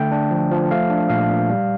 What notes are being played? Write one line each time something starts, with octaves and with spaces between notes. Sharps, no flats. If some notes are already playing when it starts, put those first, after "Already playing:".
Already playing: D3 A3 G5
D4
F3
F3
A3 F5
D4
A#2 F5
A#2
G3